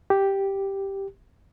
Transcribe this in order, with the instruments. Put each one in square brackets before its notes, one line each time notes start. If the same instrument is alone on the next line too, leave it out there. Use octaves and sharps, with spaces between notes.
[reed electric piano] G4